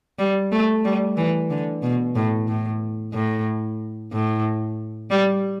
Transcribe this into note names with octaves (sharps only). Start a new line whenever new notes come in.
G3
A3
G3
E3
D3
B2
A2
A2
A2
A2
G3